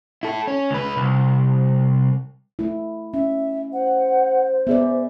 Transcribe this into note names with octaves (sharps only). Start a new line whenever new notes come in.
E4 A4
C#4
C#2 B4
C2
A3 E4
C#4 E5
C5 F#5
B3 G#4 D5 E5